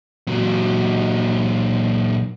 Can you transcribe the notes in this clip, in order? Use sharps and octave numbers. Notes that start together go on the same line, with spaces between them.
A#2 F#3